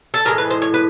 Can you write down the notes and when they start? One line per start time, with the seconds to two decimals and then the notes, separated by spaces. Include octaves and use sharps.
0.14 A4
0.25 A2 E3 G#3 A#4
0.38 B4
0.50 C5
0.62 C#5
0.74 B4